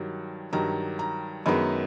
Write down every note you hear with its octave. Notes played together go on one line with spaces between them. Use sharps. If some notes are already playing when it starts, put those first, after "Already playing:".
Already playing: G2 D#3 F#3
G2 D#3 F#3 A#5
A#5
F#2 D#3 G#3 B3 B5